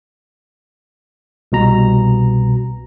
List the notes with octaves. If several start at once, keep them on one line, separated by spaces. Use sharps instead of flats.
C2 B2 A#5